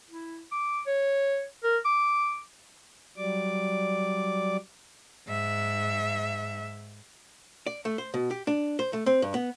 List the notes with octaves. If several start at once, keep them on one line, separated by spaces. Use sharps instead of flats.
E4
D6
C#5
A#4
D6
F#3 G3 D5 D6
G#2 E5
D5
A3
C5
B2
G4
D4
C5
A3
C4
G2
B3